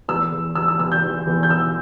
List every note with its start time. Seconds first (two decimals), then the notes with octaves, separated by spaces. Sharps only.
0.08 E2 E6
0.32 E2
0.55 E2 E6
0.68 E6
0.79 E2 E6
0.92 G6
1.03 E2
1.27 E2
1.43 G6
1.50 E2 E6